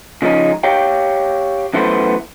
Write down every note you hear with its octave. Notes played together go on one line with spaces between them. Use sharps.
C#3 F3 G#3 C#4 D#4
G4 C#5 F5 G5
F#2 E3 A3 B3 C5